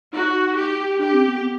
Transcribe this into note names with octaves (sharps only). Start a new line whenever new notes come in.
D#4 F#4
G4
D4 G4
C4
B3